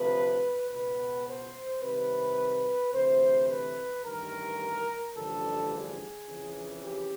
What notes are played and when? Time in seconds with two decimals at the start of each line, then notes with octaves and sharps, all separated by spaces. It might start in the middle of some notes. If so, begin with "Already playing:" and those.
Already playing: D2 C3 F3 B4
0.71 C#2 B2 B4
1.27 C5
1.82 C2 C3 D#3 B4
2.93 D2 C3 E3 C5
3.50 B4
4.05 A1 G2 D#3 A#4
5.16 A1 G2 D3 F3 A4
5.72 G#4
6.28 F2 C#3 E3
6.83 G4